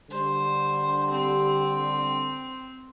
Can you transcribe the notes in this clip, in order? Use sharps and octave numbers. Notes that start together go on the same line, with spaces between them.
D3 G3 C5
C4